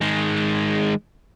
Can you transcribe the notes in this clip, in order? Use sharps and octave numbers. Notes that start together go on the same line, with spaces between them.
D#3 G#3